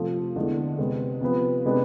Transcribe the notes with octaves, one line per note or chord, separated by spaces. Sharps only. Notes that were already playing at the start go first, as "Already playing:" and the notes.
Already playing: C3 F3 A3
E2 D3 G#3 D4
C3 G#3 B3
C3 F3 B3
C3 G#3 B3 D4